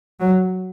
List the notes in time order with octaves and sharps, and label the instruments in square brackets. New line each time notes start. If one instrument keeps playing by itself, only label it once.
[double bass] F#3